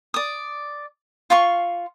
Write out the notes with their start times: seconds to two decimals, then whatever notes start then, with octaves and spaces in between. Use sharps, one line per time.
0.14 D5 D#6
1.30 F4 F5 C6 C#6